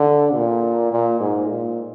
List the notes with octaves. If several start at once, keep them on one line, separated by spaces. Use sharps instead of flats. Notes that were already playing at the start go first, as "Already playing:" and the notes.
Already playing: D3
A#2
A#2
G#2
A#2